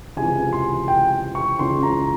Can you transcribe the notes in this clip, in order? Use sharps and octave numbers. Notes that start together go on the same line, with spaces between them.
C#2 C3 E3 G#5
C6
G5
C#6
C#2 C#3 E3 C6
A#5